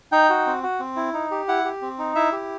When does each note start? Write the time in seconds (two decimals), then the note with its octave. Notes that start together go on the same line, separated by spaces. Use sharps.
0.12 D#4 G5
0.30 F#4
0.47 C4
0.63 F#4
0.80 C4
0.96 E4
1.14 D#4
1.31 G4
1.48 E4 F#5
1.65 G4
1.82 C4
1.98 D#4
2.15 E4 E5
2.32 G4